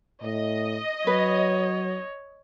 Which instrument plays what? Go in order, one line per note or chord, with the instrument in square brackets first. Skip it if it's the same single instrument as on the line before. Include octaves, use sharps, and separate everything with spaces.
[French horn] A2 [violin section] D#5
[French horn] F#3 [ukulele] B4 [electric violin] C#5